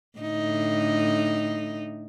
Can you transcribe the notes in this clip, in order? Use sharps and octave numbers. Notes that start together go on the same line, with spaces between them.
A2 D3 D#4